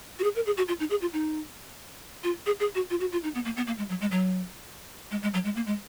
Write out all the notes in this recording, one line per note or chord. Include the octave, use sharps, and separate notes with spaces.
F#4
G#4
A#4
G#4
F#4
F4
D#4
G#4
F4
D#4
F4
G#4
G#4
F#4
F4
F#4
F4
D#4
B3
A#3
B3
A#3
G#3
F#3
G#3
F#3
G#3
G#3
F#3
G#3
A#3
G#3